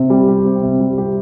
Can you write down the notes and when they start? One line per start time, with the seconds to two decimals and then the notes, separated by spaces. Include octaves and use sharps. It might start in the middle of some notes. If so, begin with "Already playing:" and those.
Already playing: C3 C4
0.10 G3
0.28 G4
0.45 C4
0.63 C3
0.80 G3
0.98 G4